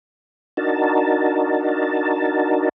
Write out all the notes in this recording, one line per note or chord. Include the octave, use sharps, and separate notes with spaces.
D4 D#4 F#4 A#4 A5